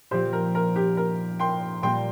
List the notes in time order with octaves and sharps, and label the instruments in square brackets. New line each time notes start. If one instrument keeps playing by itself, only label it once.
[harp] A#2 F3 C4 F4 [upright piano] G4 C5
[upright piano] A#4
A#4
G4
A#4
G5 C6
[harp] A#2 G3 A#3 [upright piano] G5 C6